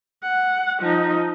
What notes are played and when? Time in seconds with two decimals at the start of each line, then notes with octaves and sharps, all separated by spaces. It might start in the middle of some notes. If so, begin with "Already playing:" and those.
0.23 F#5
0.80 F3 D#4